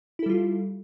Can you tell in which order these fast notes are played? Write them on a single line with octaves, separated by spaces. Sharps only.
E4 A4 G3 F4